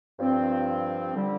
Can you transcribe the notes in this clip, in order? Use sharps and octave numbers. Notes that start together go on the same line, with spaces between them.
G2 F3 C4
D3 G3